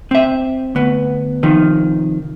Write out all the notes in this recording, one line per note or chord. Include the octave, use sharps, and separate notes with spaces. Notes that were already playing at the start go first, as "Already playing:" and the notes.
C4 E5
D2 B3
C3 D#3 F3